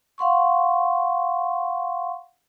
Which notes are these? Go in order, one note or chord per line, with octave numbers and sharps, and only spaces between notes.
F5 F#5 C6 C#6